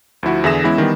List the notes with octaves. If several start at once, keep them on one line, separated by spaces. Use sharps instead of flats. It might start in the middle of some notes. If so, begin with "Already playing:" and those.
D2 F3 E4 F#4
E2 D3 G#4 E5 A#6 E7
E3 G#3 B3 C#4 E4
D#3 E3 G3 B3